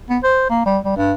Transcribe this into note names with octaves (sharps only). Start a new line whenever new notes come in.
B3
C5
A#3
G3
G3
G2